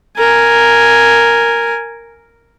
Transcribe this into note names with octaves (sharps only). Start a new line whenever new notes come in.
A#4 G#5